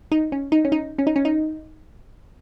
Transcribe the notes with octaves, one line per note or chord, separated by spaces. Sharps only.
D#4
C#4
D#4
C#4
D#4
C#4
D#4
C#4
D#4